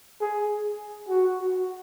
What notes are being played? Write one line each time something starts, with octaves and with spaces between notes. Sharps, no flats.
G#4
F#4
F#4